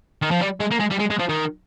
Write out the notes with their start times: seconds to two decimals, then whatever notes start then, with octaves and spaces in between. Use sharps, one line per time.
0.22 D#3
0.31 F3
0.41 G3
0.60 G#3
0.71 A#3
0.79 G#3
0.90 G3
0.99 G#3
1.10 G#3
1.19 F3
1.29 D#3